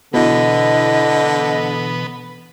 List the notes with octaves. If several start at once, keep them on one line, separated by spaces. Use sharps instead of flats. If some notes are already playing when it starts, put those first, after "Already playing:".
B2 D3 E3 B3 D#5